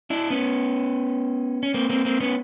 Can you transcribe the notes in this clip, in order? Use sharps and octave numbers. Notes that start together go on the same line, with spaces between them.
D4 E4
B3 C#4
C#4
A#3 C4
A#3 C4
A#3 C4
B3 C#4